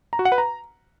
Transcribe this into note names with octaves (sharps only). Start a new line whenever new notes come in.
A#5
F#4
F#5
B4
A#5